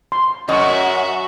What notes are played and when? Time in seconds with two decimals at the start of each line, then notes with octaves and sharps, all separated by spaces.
0.12 C6
0.49 F#2 F#4 D#5 E5 C#6